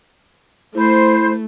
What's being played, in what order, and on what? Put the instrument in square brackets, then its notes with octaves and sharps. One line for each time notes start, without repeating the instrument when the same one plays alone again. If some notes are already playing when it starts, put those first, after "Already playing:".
[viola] A3 [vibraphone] E4 B5 [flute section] C5